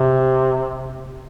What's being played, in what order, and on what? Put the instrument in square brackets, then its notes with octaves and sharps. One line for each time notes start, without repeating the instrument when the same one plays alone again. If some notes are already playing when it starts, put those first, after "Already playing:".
Already playing: [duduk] C3